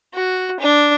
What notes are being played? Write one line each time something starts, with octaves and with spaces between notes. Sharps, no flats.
F#4
D4